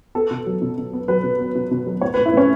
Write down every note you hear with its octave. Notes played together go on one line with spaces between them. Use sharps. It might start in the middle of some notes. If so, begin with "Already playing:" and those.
B3 A4
B2
F#3
B2
B2
B3
F#3 B4
B2
B3
B2
B2
F#3
A2 C#5
A2 B4
E4
A2 C#4